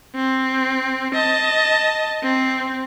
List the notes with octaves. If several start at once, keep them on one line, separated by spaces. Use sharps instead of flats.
C4
D#5 A5
C4